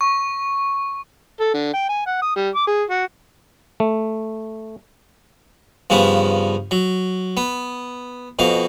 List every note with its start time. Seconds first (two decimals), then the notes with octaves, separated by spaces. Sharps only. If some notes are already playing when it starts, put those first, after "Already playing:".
0.01 C#6
1.40 A4
1.54 D3
1.73 G5
1.89 G#5
2.06 F#5
2.22 D#6
2.36 G3
2.55 D6
2.67 G#4
2.90 F#4
3.80 A3
5.90 G2 C#3 F3 B3
6.71 F#3
7.37 B3
8.39 F2 B2 F5